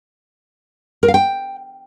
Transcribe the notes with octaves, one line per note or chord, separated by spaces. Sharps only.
A#4
F5
G5